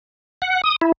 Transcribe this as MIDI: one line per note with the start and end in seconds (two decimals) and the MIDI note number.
0.42 0.61 78
0.64 0.76 87
0.81 0.92 64